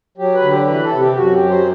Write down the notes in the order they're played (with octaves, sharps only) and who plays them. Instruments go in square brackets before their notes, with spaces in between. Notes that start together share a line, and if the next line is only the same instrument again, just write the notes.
[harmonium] F#3 G4
B4
D3
G4
E3 B4
A4
C3
G4
F#2 F#4
G4
F#3
C5